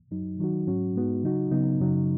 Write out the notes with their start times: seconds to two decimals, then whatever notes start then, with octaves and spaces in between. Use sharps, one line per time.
0.11 F#2 F#3 D#4
0.39 D#3 F#3 D#4 F#4
0.67 G#2 F#3 C#4 F#4
0.95 G#2 G#3 B3 D#4 F#4
1.23 C#3 F#3 D#4 F#4
1.51 C#3 F#3 B3 D#4
1.79 F#2 C#3 F#3 D#4